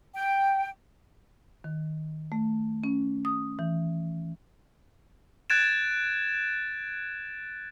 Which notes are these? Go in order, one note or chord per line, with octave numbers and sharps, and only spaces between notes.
G5
D#3
A3
C#4
D#6
E3
F#6 G#6 A6 D7 E7